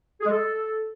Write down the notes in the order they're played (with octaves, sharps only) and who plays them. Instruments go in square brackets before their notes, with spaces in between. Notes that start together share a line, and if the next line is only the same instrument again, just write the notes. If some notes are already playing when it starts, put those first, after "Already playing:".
[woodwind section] G#4
G#3
A4